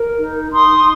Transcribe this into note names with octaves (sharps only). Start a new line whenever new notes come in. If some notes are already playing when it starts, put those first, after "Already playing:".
Already playing: A#4
D#4
D#4 C6 D#6